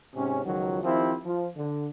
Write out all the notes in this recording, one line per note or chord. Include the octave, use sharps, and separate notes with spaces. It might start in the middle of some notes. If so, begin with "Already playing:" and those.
G#2 C3 C#4
C#2 D#3 F3 F#3
D#3 F3 C4 E4 G4
F3
D3